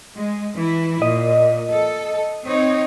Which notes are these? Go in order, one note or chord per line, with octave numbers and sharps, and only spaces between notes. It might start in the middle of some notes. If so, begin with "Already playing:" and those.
G#3
E3 E4
A#2 D#5
A4
C4 D#4 C#5